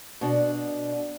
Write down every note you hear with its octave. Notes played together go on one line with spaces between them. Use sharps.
B2 D4